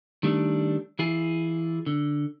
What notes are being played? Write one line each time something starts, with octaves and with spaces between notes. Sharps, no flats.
D#3 G3 A3 D4
E3 E4 F4 G#4
D3